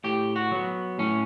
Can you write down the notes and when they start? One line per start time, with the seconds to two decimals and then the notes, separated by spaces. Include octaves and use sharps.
0.04 A2 G4
0.36 F#4
0.51 F#3 B3
0.99 A2 C#4